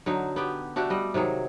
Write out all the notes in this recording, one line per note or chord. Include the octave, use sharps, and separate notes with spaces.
D3 F#3 D#4
B3 G4
A3 D4 F#4 G4
G3 D#5
C3 D#3 F#3 G#4